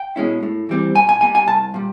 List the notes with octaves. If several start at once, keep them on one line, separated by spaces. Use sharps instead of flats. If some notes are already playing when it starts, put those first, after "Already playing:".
Already playing: G5
B2 G#3 C#4 E4
A2
E3 G3 C4
A#2 G#5
G#5
G3 A#3 G#5
G#5
C2 A5
A#2 G3